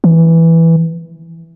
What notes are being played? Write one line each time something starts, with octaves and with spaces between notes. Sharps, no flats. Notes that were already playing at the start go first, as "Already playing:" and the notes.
E3